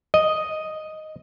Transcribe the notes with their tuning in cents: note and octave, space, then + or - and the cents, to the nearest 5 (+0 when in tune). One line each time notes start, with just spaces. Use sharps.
D#5 +0